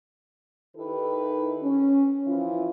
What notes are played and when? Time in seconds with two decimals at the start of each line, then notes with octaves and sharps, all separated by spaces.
0.76 D#3 D#4 E4 G4 A4 B4
1.63 C#4
2.26 E3 F3 E4 F4